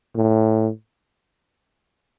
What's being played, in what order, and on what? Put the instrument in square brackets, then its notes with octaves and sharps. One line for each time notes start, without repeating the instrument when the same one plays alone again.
[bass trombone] A2